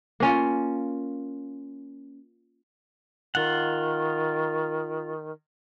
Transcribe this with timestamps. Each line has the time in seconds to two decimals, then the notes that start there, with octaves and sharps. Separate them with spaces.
0.20 A#3 C#4 F4
3.35 D#3 F4 F#5